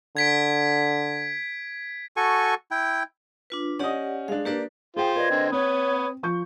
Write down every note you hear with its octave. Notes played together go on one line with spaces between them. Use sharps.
D3 G#6 B6 D7
F#4 A4 G#5 C#6
E4 G5
D4 F4 B4
C#4 G4 D5 D#5 F#5
G#3 D4 F5
A#3 D4 G4 B4 D5
F4 G#4 C5 G5
A#4 B4 D5 D#5 G#6
D3 C4
C4 B4 C#5 D#6
F3 C#6 G6